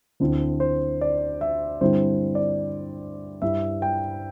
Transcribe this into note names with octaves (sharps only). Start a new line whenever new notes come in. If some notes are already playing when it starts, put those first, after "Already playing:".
D2 D3 C4 E4
C5
D5
E5
G2 D3 G3 C4 E4 C5
D5
G2 G3 E4 E5
G5